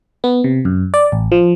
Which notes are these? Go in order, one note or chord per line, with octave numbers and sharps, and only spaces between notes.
B3
C3
F#2
D5
A1
F3